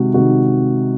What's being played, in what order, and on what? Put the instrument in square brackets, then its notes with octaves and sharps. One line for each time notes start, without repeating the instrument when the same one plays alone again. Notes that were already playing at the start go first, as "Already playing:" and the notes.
Already playing: [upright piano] C3 D#3 G#3 F#4
C3 D#3 G#3 F#4